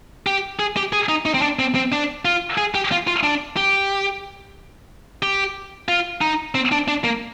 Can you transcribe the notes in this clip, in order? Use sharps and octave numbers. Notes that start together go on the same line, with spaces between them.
G4
G#4
G4
G#4
D#4
D#4
C4
D4
C4
C4
D4
F4
G#4
G4
F4
F4
D4
G4
G4
F4
D#4
C4
D4
D4
A#3